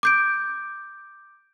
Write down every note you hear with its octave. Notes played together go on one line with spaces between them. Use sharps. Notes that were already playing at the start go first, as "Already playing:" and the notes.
D6 G6 D7